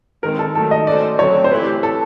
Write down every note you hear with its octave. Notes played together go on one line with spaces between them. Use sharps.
D#3 G#3 C4 A#4
A4
D#3 F#3 A3 A4
D#5
C#4 F#4 A4 C5 D5
D3 F#3 A3 C4 C#5
C5
E3 A3 C4 E4 G4 B4
A4